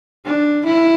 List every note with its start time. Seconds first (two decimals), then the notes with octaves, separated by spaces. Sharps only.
0.26 D4
0.65 E4